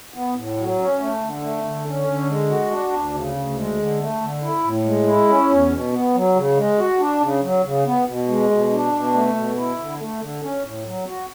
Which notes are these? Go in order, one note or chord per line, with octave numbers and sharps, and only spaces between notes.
B3
A2
F#3
C#4
A3
D3
A3
D3
C#4
D3
G#3
F#4
D4
D2
C#3
D2
G#3
D3
A3
D3
E4
A2
G#3
E4
C#4
E2
B2
B3
F#3
C#3
G#3
F#4
D4
C#3
F#3
C#3
B3
B2
G#3
B2
D4
B2
A3
B2
E4
D3
A3
D3
C#4
A2
F#3
F#4